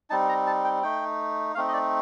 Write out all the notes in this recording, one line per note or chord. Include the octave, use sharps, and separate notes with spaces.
G3 C4 D#4 A5
A#5
A5
G5
A3 D#4 G5
A3 C4 D#4 F5
D#5
D5